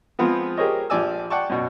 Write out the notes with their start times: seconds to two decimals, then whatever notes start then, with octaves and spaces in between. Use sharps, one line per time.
0.19 F3 G#3 B3 C4 F4 G#4
0.57 G4 G#4 A#4 C5 C#5 D#5
0.90 A#1 F3 G4 D5 G#5 E6
1.30 D5 F#5 G5 A5 C#6
1.50 F#2 B2